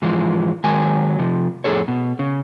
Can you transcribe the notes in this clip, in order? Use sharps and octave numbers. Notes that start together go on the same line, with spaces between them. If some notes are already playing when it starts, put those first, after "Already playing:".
G#2 E3 F3 G#3
D#3 F#3 G#3 G#5
C3 F3
F2 A2 G#3 G#4 A4 C#5
B2
C#3